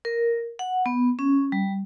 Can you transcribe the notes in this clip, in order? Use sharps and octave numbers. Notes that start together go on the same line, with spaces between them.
A#4
F#5
B3
C#4
G3